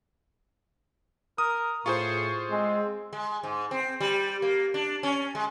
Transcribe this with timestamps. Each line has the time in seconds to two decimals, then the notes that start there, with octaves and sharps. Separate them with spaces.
1.38 A#4 D#6
1.86 A2 F4 G#4 C5 C#6
2.51 G#3 C4
3.13 G#3
3.43 G#2
3.71 C4
4.00 G3
4.42 A#3
4.74 D4
5.03 C#4
5.35 G#3